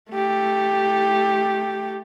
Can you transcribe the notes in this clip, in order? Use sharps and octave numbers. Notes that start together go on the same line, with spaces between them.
A3 G4